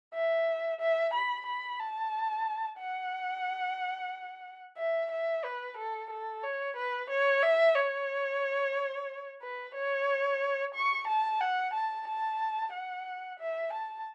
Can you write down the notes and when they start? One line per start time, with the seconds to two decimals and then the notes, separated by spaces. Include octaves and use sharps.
0.14 E5
0.80 E5
1.14 B5
1.46 B5
1.79 A5
2.79 F#5
4.77 E5
5.11 E5
5.44 B4
5.77 A4
6.10 A4
6.43 C#5
6.77 B4
7.10 C#5
7.43 E5
7.76 C#5
9.42 B4
9.75 C#5
10.75 C#6
11.08 A5
11.40 F#5
11.73 A5
12.07 A5
12.73 F#5
13.39 E5
13.73 A5